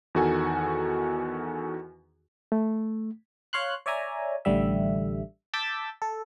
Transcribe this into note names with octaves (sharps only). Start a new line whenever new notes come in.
E2 D#3 F#4 A4 G#5
A3
C#5 F5 C6 F#6
C#5 D5 E5 G#5 A#5
A1 D3 G3 E5
A5 D6 E6 G6 A6 B6
A4